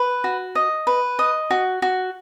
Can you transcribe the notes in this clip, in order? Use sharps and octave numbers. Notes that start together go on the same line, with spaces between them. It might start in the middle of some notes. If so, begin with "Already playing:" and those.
Already playing: B4
F#4
D#5
B4
D#5
F#4
F#4